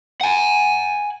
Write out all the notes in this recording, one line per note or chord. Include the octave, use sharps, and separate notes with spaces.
F#5 G#5